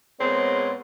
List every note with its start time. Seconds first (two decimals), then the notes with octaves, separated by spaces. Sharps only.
0.21 A#2 G#3 B3 C4 G#4 C#5